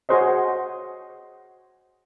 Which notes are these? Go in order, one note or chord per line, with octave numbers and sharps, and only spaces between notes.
F#4 G#4 C5 C#5 D#5